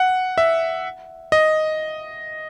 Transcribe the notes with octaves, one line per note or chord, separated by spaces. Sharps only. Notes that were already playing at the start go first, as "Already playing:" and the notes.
Already playing: F#5
E5
D#5